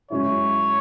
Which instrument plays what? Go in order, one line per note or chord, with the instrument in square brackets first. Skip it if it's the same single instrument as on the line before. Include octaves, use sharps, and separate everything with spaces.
[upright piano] F#2 C#3 G#3 C#4 E4 [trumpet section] C#5